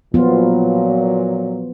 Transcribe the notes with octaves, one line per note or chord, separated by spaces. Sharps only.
A#2 F3 F#3 B3 F4